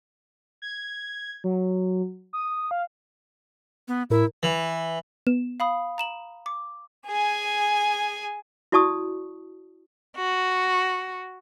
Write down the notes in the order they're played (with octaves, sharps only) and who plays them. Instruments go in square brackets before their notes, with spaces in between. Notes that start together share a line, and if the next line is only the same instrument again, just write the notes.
[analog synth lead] G#6
F#3
D#6
F5
[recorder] B3
[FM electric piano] A2 A#4 [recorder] E4
[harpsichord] E3
[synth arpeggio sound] B3 [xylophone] E7
[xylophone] F5 B5 D#6
A#5 E7 F#7
D6
[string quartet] G#4 G#5
[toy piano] E4 F#4 D5 A5 C#6 D#6
[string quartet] F#4